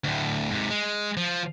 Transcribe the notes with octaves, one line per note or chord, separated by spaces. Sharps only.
D2 A2
G#2 C3
G#3
F3